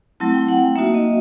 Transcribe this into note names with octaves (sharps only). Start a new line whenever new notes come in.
F#3 A3 C4 E4 A5
G5
F#5
F#5
A#3 D#4 F#4 E5
D#5